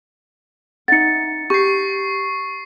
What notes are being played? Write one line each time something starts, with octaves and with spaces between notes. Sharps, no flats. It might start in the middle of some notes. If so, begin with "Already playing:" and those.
D#4 E5 F#5 A6 C#7
G4 C#6 C7